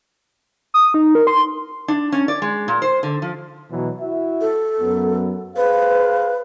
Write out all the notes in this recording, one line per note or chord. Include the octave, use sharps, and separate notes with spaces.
D#6
D#4
A#4
C6
D4
C#4
D5
G#3
A#2
C5
D3
F3
B2 E3 F#3
E4 F#4 E5
A4
F#2 F#3 B3
G#4 B4 C5 F5